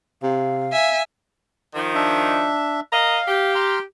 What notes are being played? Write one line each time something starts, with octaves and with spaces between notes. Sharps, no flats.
C3 F5
E5 G#5
D#3 F3 D#4
D4 E5
A#4 D#5 F5
G4
A#5 C6 F6